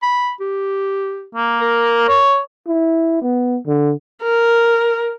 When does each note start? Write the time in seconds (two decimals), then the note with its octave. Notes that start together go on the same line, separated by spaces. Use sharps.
0.02 B5
0.40 G4
1.35 A#3
1.61 A#4
2.08 C#5
2.67 E4
3.23 B3
3.67 D3
4.23 A#4